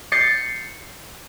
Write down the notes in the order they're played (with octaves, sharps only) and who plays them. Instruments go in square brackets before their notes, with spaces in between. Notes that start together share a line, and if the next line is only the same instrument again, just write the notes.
[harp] G6 A6 C7 C#7